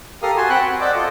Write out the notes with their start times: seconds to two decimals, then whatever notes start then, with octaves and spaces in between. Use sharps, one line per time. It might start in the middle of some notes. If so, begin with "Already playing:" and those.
0.22 G4 A4 A#4 F5 D#6 F6
0.37 F#4 G#5 A5 C6
0.50 C4 F#5 G5 B5 F#6
0.65 F#4
0.81 C5 D5 D#5 F#5 D6 E6
0.94 F4 A4 D#5